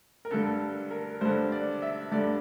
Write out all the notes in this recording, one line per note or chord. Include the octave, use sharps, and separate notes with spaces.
A#4
G2 D3 A4
A#4
G2 D3 C5
D5
E5
G2 D3 D5